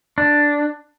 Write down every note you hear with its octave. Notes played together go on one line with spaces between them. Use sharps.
D4